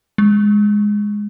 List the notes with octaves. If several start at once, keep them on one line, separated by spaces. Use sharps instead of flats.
G#3